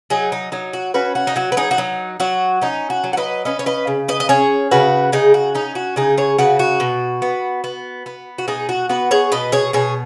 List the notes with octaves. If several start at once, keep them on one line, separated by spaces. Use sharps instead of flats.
F#3 D#4 G#4
D#4
F#3 D#4
F#4
C#4 F#4 B4
F#4
D#4
F#3 F#4
B4
D#4 G#4
F#4
F#3 D#4
F#3 F#4
C#4 D#4
F#4
F#3
F#5
B4 D#5
C#4 B4 D#5
C#5
B4 D#5
C#3
B4 D#5
D#5
C#4 G#4 C#5
C#3 F#4 B4
C#3 D#4 G#4
F#4
C#4 D#4
F#4
C#3 D#4 G#4
G#4 C#5
C#3 F#4 B4
F#4
B2
B3
B3
B3
F#4
B2 D#4 G#4
F#4
B3 F#4 B4
G#4 C#5
B2 B4 D#5
G#4 C#5
B2 G#4 C#5